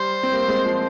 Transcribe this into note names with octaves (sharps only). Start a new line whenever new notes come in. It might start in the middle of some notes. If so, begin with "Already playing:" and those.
Already playing: G3 C5
C4
G3 A#3
G#3 C4
F3